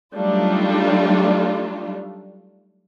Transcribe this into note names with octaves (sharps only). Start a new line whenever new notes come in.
F#3 G3 A3 D4 D#4 F4